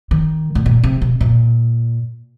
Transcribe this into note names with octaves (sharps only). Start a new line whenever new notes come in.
D#3
A2
A#2
C3
B2
A#2